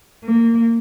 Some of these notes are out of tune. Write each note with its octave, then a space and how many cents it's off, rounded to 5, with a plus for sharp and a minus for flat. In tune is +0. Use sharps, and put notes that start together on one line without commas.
A#3 -15